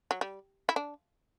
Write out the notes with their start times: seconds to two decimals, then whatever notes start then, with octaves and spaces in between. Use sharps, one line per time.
0.11 F#3
0.21 G3
0.69 E4
0.76 D4